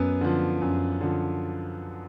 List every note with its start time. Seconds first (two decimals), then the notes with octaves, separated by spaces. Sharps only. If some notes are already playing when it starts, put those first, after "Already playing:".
Already playing: F#2 B3
0.21 D3 F3
0.62 F#2
1.01 D3 F3